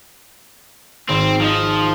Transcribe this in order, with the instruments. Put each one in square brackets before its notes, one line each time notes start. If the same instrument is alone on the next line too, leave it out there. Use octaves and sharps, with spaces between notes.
[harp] G#1 [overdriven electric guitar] C4
[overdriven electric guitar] F3 [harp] D#4 D#5